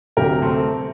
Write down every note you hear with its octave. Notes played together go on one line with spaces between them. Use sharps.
D2 C3 F#3 G4 A#4
A3 C4